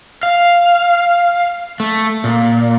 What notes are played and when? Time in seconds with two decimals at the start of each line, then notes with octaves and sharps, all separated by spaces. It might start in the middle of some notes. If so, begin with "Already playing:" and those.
0.23 F5
1.80 A3
2.24 A#2